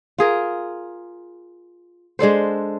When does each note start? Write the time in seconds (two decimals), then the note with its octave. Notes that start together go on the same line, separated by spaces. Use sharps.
0.18 F4 G#4 A#4
2.19 G#3 D4 A4 C5